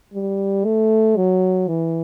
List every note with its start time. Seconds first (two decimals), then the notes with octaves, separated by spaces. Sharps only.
0.14 G3
0.65 A3
1.16 F#3
1.68 E3